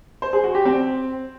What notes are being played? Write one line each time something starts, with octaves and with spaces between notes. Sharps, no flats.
C5
G#4
F#4
G4
C4